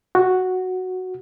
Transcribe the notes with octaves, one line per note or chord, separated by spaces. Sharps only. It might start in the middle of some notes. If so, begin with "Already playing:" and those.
F#4